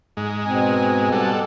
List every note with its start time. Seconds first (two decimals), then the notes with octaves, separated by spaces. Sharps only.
0.17 G#2 G#3
0.45 B2 C4 G#5
1.12 G3 A4 F#5